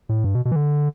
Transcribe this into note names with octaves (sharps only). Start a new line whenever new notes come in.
A2
G2
B2
B2
E3
D3